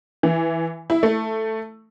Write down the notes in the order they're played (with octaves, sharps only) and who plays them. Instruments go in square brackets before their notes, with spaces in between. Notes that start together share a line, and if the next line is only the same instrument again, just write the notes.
[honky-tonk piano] E3
E4
A3